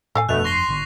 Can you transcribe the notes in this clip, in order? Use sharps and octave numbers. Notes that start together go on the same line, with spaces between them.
A2 A4 F5 G#5
G1 F2 B2 A3 D4 F#6 F7
C6 C#6 A#6 C7
G#1 D3